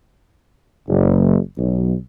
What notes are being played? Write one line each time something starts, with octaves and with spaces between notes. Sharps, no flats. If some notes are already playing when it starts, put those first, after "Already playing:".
F#1
B1